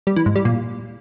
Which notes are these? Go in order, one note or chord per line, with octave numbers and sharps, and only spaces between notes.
G3
E3
G#2
G3
A#2